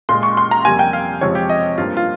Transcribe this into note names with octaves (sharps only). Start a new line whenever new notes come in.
A#2 G#3 C6
C#6
C6
A#5
F2 C3 G3 A#3 G#5
G5
F5
F2 C3 F3 G#3 C#5
G4
D#5
G2 F3 A#3 F4
F4